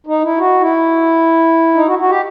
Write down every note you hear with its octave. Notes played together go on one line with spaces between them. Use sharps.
D#4
E4
F#4
E4
D#4
F#4
F#4
G4